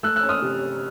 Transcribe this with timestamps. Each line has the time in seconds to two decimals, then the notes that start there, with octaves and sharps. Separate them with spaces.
0.03 A3 E6 F#6
0.16 E6 F#6
0.23 C#4
0.29 D#6 F6
0.42 C3